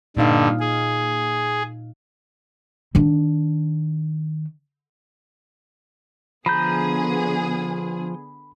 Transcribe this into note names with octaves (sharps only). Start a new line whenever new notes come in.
G2 A#2 D3 D#4 F5
G#4
D#3 D4
D3 F3 B3 G#4 A#5 B5 G6